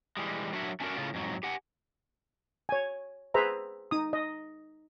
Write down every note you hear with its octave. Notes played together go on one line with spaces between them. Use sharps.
E3 G3 G#3
F#3 D4 F#4 A#4 C#5 E5
A3 C#4 D4 F#4 A4 A#4
A2 C#3 F4
F2 G#2 F#3
G4 F#5 G#5
C#5 G#5
G#4 B4 C5 E5 A#5
D#4 D#6
D#5